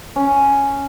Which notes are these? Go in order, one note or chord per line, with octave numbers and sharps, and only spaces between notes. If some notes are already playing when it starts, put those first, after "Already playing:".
C#4